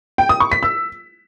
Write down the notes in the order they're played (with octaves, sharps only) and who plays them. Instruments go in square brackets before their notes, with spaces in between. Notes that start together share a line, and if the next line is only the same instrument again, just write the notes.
[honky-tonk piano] G5
D#6
C#6
B6
E6